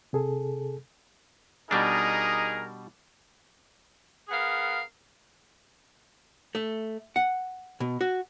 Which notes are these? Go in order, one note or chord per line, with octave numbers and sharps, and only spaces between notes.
C3 G#4 A4
B2 G3 D4 D#4 G#4 A#4
B3 G#4 A#4 F5
A3
F#5
B2
F#4